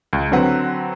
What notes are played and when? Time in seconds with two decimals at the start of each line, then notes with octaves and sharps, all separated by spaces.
0.13 C#2
0.31 D3 F#3 C4 B4 F#5